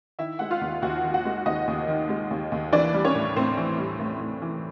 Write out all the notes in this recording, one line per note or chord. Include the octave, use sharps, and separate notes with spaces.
D#3 E4 E5
G#3 F#5
F4 F5
D#2
D#2 F#4 F#5
D#3
F#4 F#5
G#3
D#2 D#4 D#5
D#2
D#3
G#3
D#2
D#2
E3 D4 D5
G3
C#4 C#5
A2
A2 C4 C5
E3
G3
A2
A2
E3